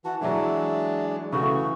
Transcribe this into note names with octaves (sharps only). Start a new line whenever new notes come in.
E3 F#4 A5
E3 F#3 G#3 D4 E5
C#3 E3 A3 F#4 C#6